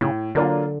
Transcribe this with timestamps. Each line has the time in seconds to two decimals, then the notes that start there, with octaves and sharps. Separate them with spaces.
0.01 A2 C#3
0.35 D3 F#3 A#3 D4 F4